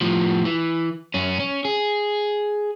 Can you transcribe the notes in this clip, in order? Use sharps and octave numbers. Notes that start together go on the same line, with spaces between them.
A2 F3
E3
F#2 C#4
C#4
G#4